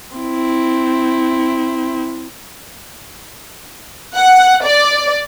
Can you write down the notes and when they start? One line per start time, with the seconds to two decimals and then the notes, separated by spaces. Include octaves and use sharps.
0.17 C4 E4
4.16 F#5
4.65 D5